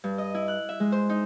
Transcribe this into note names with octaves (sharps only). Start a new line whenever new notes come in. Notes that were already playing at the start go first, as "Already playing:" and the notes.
G2
D#5
E4
F#6
E5
G#3
C5
D#4